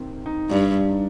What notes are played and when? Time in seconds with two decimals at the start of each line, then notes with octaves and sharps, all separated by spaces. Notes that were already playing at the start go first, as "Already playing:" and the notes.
Already playing: C3 D#3 C4
0.26 D#4
0.50 G2 D4
0.89 D#4